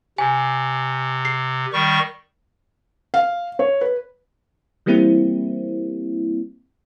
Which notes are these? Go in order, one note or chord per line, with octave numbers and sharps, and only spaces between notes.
C3 G#5
C7
D#3 G3 C#6
F5
C#5
B4
E3 G3 A#3 C4 E4